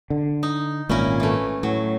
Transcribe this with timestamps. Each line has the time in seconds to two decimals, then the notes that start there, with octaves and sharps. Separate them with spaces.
0.10 D3
0.43 D#4
0.89 G#1 A#2 C#4 E4 A#4
1.20 E3 A3
1.63 A2 F#3